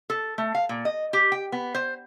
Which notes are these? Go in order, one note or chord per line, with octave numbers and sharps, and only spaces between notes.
A4
A3
F5
A#2
D#5
G4
G5
B3
C5